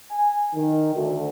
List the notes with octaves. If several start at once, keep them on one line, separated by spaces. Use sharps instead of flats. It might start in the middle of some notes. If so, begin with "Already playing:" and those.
G#5
D#3
D2